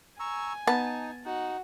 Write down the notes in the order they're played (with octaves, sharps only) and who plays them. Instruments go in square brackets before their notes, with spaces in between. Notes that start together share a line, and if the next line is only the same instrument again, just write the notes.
[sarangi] G#5 [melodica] A#5 C#6 E6
[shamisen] B3 [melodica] D#4 [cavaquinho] A5
[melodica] D#4 [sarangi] F#4